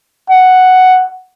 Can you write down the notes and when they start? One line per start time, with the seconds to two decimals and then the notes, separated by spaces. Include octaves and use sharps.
0.30 F#5